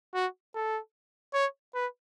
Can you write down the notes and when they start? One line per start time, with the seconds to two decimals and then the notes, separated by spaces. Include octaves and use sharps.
0.14 F#4
0.55 A4
1.34 C#5
1.74 B4